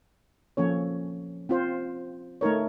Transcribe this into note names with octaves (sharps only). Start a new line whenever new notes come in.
F3 A#3 C#4 A4 C#5
C4 F4 C5
A3 D#4 A#4 C#5